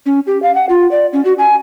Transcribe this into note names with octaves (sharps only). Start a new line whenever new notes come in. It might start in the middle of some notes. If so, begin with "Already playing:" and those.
C#4
G4
F5
F#5
F4
D5
C#4
F#4
G#5